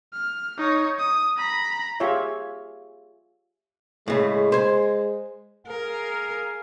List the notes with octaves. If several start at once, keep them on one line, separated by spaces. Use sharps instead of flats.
F6
D#4 C#5
D#6
A#5 B5
F4 G4 G#4 C#5 E5
A2 C#3 G#3
C5 G#5
G#4 A#4 F5